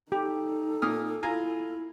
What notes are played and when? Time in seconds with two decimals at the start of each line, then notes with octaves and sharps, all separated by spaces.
0.12 D#4 G4 A4
0.82 A#2 D#6 F6
1.23 E4 F4 G#5 A#5